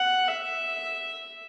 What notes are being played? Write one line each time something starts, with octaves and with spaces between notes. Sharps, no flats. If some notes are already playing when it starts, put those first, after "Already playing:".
Already playing: F#5
E5